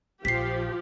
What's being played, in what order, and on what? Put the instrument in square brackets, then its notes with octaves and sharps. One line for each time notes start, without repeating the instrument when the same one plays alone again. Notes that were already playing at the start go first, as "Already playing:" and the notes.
[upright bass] A#1 [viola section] F3 G4 [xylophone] B6 C7